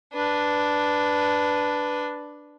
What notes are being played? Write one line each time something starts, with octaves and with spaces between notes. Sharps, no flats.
D4 B4